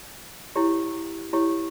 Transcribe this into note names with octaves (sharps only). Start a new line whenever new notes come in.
E4 G4 C#5
E4 G4 C#5